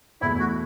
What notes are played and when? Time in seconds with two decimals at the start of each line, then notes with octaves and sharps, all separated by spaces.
0.21 E2 B2 A3 E4
0.40 F#4